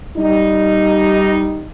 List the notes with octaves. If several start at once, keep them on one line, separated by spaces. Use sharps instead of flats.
G3 D#4